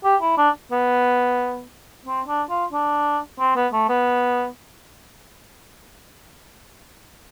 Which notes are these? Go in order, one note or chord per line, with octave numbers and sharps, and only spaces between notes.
G4
E4
D4
B3
C4
D4
F4
D4
C4
B3
A3
B3